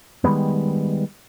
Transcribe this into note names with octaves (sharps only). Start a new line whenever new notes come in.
D#3 G3 G#3 B3